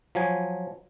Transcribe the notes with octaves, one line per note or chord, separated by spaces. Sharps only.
F3 F#3 G#5